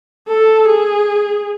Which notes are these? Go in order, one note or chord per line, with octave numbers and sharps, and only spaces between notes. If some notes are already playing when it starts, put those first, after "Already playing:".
A4
G#4